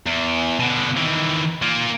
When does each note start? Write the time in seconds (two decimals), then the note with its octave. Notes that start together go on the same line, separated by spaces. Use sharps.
0.06 E2
0.59 B2 D3
0.96 D#3 E3
1.62 A#3 F4